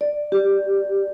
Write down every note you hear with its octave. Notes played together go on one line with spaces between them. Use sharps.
D5
G4